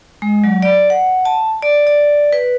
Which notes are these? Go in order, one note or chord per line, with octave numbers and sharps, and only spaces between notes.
G#3
F#3
D5
F#5
A5
D5
D5
B4